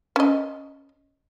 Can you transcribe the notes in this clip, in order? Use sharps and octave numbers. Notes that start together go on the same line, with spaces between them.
C#4 D#5